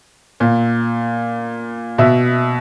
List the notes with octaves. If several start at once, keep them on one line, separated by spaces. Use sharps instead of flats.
A#2
B2 E5